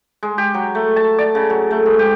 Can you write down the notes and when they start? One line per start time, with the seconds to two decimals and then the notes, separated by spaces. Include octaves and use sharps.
0.23 G#3
0.38 G4
0.54 F#3
0.75 A3
0.96 A5
1.18 D5
1.35 C#3
1.50 F#3
1.71 A3
1.86 G#2
1.99 G4